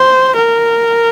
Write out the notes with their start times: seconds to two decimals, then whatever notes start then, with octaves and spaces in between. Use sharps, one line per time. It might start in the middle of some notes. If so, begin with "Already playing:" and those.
Already playing: C5
0.36 A#4